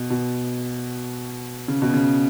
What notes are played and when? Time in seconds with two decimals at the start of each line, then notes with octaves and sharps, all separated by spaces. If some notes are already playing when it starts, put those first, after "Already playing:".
Already playing: B2
0.10 B2
1.68 C#3
1.82 B2
1.94 C#3